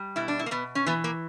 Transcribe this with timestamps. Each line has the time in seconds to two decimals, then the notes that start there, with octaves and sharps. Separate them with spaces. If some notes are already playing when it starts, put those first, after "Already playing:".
Already playing: G3
0.16 B2 E4
0.28 D4
0.39 E4
0.46 A#3
0.51 B2 B3
0.75 C#4
0.86 E3 B3
1.04 A#3